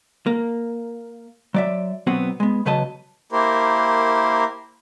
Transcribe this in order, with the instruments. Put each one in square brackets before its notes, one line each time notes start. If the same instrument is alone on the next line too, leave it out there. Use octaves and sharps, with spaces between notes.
[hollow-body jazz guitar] A#3
F#3 D5 E5
B2 F#3 B3 C4 F#4
G#3 B3
E2 C#3 F#3 B4 D#5 A5
[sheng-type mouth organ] A#3 E4 G4 A#4 C5